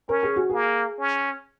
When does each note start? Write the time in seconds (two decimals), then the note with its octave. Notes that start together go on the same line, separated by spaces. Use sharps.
0.09 C#4 A#4
0.23 G#4
0.36 F#4
0.50 A#3 G#4
0.99 C#4